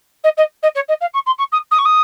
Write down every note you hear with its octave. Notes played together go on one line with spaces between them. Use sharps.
D#5
D#5
D#5
C#5
D#5
F5
C#6
C6
C#6
D#6
D#6
C#6
D#6